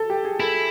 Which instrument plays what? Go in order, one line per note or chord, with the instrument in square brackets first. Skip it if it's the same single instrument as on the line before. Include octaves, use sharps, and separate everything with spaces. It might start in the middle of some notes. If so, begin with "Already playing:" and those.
Already playing: [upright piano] A4
G4
G#4
[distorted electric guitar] E4 [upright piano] A4